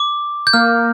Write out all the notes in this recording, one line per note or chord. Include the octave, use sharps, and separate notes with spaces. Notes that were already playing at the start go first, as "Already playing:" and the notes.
Already playing: D6
G6
A#3 F6